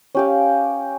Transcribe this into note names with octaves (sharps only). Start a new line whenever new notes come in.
C#4 G4 F5